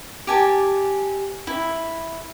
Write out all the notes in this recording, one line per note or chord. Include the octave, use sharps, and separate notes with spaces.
G4 G#5 A5
E4